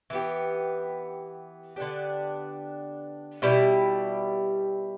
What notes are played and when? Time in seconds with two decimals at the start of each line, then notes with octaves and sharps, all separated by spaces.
0.10 E3 B3 G4
1.76 D3 B3 D4 G4
3.42 B2 G3 E4 G4